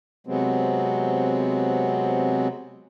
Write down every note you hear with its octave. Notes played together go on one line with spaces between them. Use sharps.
C3 F#3 G#3 B3 C4